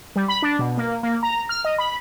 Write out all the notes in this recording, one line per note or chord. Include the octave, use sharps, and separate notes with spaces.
G3
B5
D4
B2
A#3
A#3
A#5
F6
D#5
B5